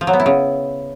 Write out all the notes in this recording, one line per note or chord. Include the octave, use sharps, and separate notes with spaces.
F3
F#3
B3
E4
C#3